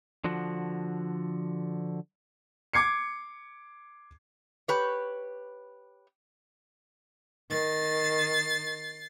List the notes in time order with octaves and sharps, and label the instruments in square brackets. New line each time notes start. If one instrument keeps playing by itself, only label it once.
[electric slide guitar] D3 F3 F#4
[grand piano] D6 G#6 C7 C#7
[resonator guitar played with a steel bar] G4 B4 C#5
[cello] D#3 [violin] A6 C7